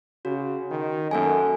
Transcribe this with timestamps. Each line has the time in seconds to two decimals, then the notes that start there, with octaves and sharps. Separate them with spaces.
0.25 C#3 F#4
0.71 D#3
1.11 F#2 A#3 A4 G#5